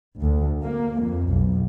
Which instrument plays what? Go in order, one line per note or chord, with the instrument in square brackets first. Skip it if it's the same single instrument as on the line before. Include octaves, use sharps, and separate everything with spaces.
[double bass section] D2
A#3
F2
B1